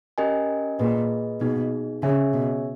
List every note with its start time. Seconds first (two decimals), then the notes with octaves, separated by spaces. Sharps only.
0.18 C#4 G4 A#4 D#5 G#5
0.79 A#2 G#4 B4 D#5
1.41 B2 B3 D#4 G#4
2.02 C#3 C#4 G#4 C#5 E5 G#5
2.33 B2